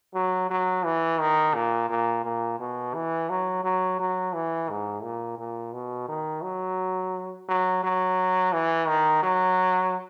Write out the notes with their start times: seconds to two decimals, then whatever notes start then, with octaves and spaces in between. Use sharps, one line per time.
0.14 F#3
0.50 F#3
0.85 E3
1.20 D#3
1.54 A#2
1.89 A#2
2.24 A#2
2.59 B2
2.94 E3
3.29 F#3
3.64 F#3
3.99 F#3
4.34 E3
4.69 G#2
5.03 A#2
5.38 A#2
5.73 B2
6.08 D#3
6.43 F#3
7.48 F#3
7.83 F#3
8.53 E3
8.87 D#3
9.23 F#3